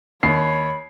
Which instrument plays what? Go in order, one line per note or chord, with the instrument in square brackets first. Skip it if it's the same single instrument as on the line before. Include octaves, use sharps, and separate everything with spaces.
[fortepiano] D#2 [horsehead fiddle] C#5 [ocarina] B5 [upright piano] C7